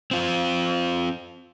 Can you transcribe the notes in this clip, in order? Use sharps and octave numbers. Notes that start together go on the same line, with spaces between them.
C4 F4